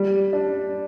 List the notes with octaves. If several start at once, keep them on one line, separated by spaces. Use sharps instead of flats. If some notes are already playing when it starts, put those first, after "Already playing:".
Already playing: G3
D4